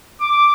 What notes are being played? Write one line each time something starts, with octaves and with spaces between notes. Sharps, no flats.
D6